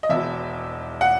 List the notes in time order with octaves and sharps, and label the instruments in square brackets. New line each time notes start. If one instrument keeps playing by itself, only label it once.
[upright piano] D#5
E1 E2 B2 E5
F#5